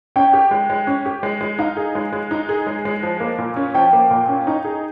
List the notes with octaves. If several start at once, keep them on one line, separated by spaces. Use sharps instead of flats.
C#4 G5
G4
G#3
G#3
C#4
G4
G#3
G#3
D#4 F5
G#4
G#3
G#3
D#4
G#4
G#3
G#3
F3
A#3
A#2
C#4
F3 G5
A#3
A#2
C#4
D#4
G#4